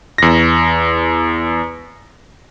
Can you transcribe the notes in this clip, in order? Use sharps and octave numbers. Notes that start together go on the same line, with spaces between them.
E2 A#6